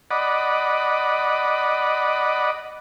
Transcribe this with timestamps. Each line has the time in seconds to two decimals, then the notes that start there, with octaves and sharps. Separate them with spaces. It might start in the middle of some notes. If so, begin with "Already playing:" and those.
0.11 D5 D#5 F#5 B5